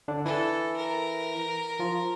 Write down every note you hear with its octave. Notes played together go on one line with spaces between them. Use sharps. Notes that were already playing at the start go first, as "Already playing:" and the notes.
D3 D4
E3 E4 A4
A#4
F3 F4